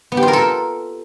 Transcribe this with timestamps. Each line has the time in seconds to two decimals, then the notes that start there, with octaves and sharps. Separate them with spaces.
0.12 B3
0.17 G4
0.23 F4
0.28 A#4
0.33 A4